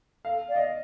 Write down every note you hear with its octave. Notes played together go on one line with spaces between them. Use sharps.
A4 F5
D5 F5
D#5